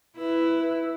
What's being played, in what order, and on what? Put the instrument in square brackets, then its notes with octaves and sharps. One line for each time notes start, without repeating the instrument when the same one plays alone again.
[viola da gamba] E4 [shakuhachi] B4